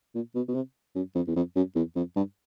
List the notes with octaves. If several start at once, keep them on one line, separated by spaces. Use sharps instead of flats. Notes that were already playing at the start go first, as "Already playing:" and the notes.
A#2
B2
B2
C3
F#2
F2
E2
F2
F#2
E2
F2
G2